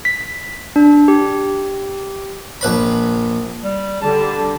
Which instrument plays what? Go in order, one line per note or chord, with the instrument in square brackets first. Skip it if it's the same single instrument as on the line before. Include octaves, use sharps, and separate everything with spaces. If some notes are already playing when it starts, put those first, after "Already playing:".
[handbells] B6
D4
G4
[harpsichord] A#1 B4 B5
[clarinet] G3
[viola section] D3 G3 [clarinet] A5